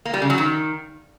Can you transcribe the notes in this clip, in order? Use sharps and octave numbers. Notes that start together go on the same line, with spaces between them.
A#3
G3
C#3
F#3
D#3